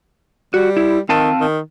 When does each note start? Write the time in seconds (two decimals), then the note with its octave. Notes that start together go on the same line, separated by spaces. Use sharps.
0.54 G3 F#4
0.77 E4
1.09 D#3 C4 F5 A5
1.40 D#3